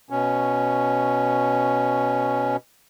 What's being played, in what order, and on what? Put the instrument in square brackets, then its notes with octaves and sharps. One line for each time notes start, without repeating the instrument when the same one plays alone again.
[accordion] B2 C#4